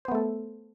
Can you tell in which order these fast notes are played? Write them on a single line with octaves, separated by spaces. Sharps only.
C5 B3 A3 A4